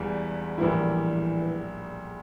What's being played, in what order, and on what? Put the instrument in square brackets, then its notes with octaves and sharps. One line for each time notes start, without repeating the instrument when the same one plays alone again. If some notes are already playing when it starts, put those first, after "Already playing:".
Already playing: [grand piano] E1 E2 E3 G3
[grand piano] A#1 A2 G3 A#3 E4 [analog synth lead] E3